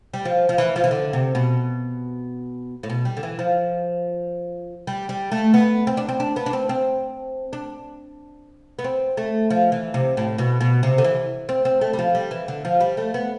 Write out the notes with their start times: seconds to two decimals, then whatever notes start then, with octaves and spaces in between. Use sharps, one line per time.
0.14 G3
0.25 F3
0.49 F3
0.58 E3
0.76 F3
0.84 E3
0.91 D3
1.13 C3
1.35 B2
2.83 A2
2.90 B2
3.05 G3
3.17 D3
3.23 E3
3.39 F3
4.87 G3
5.09 G3
5.32 A3
5.54 B3
5.87 C4
5.97 D4
6.09 C4
6.20 D4
6.36 B3
6.46 D4
6.53 C4
6.69 C4
7.53 D4
8.79 B3
8.84 C4
9.17 A3
9.50 F3
9.72 E3
9.94 C3
10.17 A2
10.38 B2
10.61 B2
10.83 C3
10.98 D3
11.04 E3
11.49 C4
11.65 C4
11.81 A3
11.93 G3
11.99 F3
12.15 G3
12.31 E3
12.48 D3
12.65 F3
12.80 G3
12.97 A3
13.14 B3